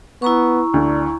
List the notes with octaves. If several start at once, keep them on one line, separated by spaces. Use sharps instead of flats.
B3 E4 A#5 C#6
D2 D4